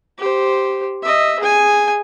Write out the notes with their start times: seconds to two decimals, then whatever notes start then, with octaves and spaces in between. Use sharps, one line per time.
0.18 G4 C5
1.03 D#5 E5
1.39 G#4 G#5